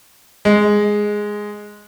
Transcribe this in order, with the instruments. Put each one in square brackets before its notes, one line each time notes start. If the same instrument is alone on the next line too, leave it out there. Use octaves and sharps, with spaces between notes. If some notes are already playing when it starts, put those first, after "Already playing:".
[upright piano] G#3